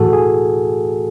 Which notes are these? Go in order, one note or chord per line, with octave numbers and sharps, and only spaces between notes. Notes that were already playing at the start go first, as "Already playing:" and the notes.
Already playing: A2 E3 A3 F#4 G#4 A4
G#4